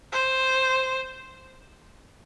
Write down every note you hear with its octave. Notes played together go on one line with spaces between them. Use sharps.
C5